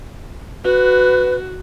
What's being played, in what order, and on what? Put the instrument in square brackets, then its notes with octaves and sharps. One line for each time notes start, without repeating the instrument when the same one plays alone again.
[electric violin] F#4 [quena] B4